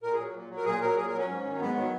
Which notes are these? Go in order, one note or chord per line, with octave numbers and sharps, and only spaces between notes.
A#2 A#4
G#4
F#3
A#2
F#3
A#4
A#2 G#4
F#3 A#4
A#2 G#4
A#4
F#3
C#4
G#2
D#3 F#3
G#2 B3
D#3 F#3